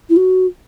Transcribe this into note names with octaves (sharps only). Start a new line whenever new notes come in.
E4
F#4